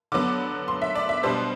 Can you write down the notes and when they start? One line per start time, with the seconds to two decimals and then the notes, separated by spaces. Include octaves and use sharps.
0.12 D3 F#3 B3 D6
0.68 C6
0.82 E5
0.95 D5
1.09 E5
1.23 B2 G3 B3 D4 C5